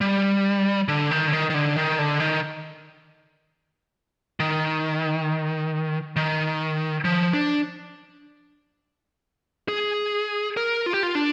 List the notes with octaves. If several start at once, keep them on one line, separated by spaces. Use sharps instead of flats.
G3
D3
D#3
D3
D#3
D#3
D3
D#3
D3
D#3
D#3
D#3
F3
D4
G#4
A#4
F4
G4
F4
D4